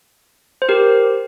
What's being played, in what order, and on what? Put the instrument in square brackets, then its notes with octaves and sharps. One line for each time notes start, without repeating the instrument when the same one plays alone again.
[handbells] C5
G4 A#4